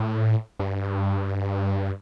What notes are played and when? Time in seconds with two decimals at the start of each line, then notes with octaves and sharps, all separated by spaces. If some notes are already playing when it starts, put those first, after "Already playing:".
Already playing: A2
0.59 G2